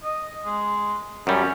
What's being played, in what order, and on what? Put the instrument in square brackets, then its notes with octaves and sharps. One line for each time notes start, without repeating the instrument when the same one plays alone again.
[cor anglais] D#5
G#3
[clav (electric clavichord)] F#2 G3 [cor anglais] C#4